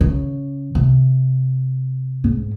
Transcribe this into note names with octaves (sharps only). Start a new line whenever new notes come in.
C#3
C3
G#2